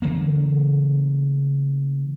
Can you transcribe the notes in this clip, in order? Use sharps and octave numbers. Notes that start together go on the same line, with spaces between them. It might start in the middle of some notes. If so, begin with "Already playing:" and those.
C#3 E3 A3 A#3